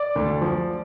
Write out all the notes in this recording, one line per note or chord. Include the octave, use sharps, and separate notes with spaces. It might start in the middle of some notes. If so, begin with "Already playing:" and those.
Already playing: D5 D6
D2
F3